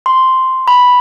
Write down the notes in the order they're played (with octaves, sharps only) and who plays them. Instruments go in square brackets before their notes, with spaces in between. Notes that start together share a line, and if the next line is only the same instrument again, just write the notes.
[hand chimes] C6
B5